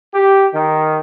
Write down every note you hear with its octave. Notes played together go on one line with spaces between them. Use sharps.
G4
D#3